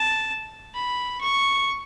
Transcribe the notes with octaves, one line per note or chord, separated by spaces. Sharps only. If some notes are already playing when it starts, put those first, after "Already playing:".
Already playing: A5
B5
C#6